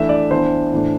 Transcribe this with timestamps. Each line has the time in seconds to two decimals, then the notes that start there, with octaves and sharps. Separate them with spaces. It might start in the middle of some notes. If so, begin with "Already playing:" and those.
Already playing: E3 A3 D4 E5
0.09 D5
0.31 E3 B3 D4 C5
0.72 A2 E3 A3 D4